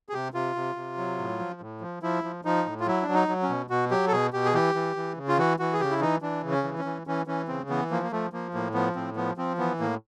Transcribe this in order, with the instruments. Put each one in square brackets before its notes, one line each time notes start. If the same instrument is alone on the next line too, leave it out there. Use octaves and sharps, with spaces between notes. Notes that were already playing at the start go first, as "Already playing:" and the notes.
[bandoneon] G#4
C3 G4
C3 F4
C3
C3
F#3
A2
F3
A2
F3
F3 E4
F3
F3 D#4
A2
F4
F#3 E4
D4
F#3
D#4
F#3
C#4
B2
B2 F#4
F#3 G4
A4
B2 G#4
B2 G4
G#4
E3 G4
E3
E3
C#3
F4
E3 F#4
E3 F#4
G#4
C#3 G4
E4
E3 D#4
E3 D4
C#3
C#4
E3
C#4
E3
E3 C#4
E3 C#4
C#3 C4
E3 B3
F3 A#3
A#3
F3 A3
F3 A#3
A2 A#3
F3 B3
A2 C4
F3 B3
F3 C4
E3 B3
A2 A#3